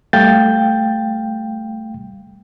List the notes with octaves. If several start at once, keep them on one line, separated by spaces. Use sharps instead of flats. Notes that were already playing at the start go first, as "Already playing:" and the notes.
G3 A3 F5 G5 G6 A6